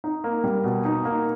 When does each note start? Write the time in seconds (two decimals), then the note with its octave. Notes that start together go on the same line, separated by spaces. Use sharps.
0.04 D#4
0.24 A#3
0.44 G3
0.64 B2
0.85 D#4
1.05 A#3